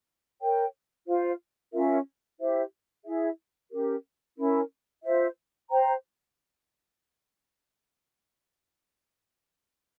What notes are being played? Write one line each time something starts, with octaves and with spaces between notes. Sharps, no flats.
A#4 C#5 G5
F4 C5 F5
C#4 F4 A#4 E5
E4 G4 C5 E5
E4 G#4 E5
C#4 G4 A#4
C#4 E4 A#4
F4 C5 E5
C5 G5 A#5